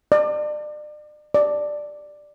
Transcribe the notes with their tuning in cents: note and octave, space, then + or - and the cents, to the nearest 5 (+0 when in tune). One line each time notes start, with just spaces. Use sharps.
D5 +35
D5 +5